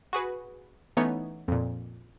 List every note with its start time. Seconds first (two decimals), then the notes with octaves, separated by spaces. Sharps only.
0.13 F#4 G#4 B4
0.97 E3 A3 B3 C#4 D#4 C#5
1.48 F2 A#2